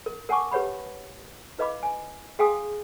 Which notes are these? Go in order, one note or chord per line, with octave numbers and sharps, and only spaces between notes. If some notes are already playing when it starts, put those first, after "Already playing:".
A#4
A#4 F#5 G#5 A5 C#6 D6
G4 B4 C#5 F#5 B5
E4 B4 D#5 F5 B5 D6
G#5
G#4 F5 G5 G#5 C6 D#6